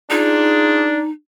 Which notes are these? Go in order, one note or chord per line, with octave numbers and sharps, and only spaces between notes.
D4 D#4 F4 G#4